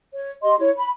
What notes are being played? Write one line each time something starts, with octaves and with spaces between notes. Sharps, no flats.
C#5
G4 D#5 C6
E4 C#5
B5